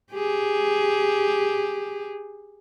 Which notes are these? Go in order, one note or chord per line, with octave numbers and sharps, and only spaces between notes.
G4 G#4